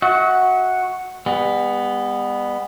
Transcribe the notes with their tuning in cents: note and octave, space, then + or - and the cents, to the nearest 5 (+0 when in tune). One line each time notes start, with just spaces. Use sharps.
F#4 +0 E5 -45
G3 +45 B3 +0